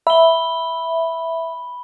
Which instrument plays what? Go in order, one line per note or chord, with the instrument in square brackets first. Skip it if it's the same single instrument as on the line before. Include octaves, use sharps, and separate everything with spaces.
[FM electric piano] E5 [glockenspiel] B5 G7